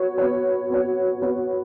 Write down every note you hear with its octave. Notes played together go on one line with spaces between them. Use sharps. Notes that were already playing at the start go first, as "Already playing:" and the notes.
Already playing: B3 F#4 C#5
B3 F#4 C#5
B3 F#4 C#5
B3 F#4 C#5